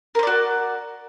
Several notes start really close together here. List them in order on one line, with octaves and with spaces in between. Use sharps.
A#4 C5 D5 F#4